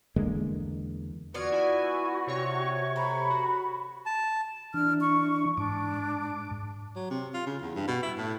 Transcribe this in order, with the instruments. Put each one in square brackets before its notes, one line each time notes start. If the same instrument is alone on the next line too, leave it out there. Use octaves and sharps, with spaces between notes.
[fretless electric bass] E2 D3 G#3 A#3
[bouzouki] B3 F4 D5 [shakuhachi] F#4 [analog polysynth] F6 G#6 C#7
[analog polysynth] E4 G#5
C3 C#5 C#6
[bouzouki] A3 A#5 [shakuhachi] B5
[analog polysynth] F#4
[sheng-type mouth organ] A5
[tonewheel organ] E3 D4 [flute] F6
[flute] C#6
[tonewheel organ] G#2 D6 [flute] D4
[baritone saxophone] F#3
C3
F4
C#3
E2
G2
B2
E4
A2